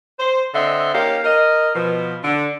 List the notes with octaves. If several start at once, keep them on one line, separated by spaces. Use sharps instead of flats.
C5
D3 C4 D#5 E5 F#5 C6
A#3 C#4 D#4 G4 F5
A#4 D#5
B2 F3
D3